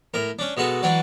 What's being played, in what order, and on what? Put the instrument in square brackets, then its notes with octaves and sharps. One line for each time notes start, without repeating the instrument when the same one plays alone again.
[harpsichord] A2 A#4
C#4 D4
B2 G#3 F#4 A4
E3 F#3 D4 F#4 D5